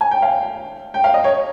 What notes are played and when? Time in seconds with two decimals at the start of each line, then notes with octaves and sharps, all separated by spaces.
0.01 G#5
0.11 G5
0.22 F5
0.94 G5
1.04 F5
1.14 D#5
1.24 C#5